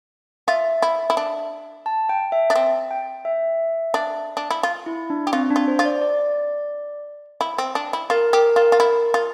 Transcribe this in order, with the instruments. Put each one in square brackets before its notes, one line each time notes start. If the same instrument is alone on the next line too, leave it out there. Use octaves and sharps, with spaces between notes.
[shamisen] F4 [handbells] E5
[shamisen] E4
E4
D4
[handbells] A5
G5
E5
[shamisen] D4
C4
[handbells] G5
E5
[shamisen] D4
D4
E4
F4
[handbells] E4
D4
[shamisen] G4
[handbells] C4 [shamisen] F4
[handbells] D4
[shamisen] F4
[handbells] C5
[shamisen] F4
[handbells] D5
D5
[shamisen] E4
C4
D4
E4
[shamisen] F4 [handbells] A#4
[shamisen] G4 [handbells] A#4
[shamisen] F4 [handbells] A#4
[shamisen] F4
E4
F4